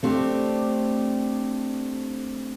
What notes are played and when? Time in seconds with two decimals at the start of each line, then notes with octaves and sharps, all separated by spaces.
0.03 A3 C4 D4 G4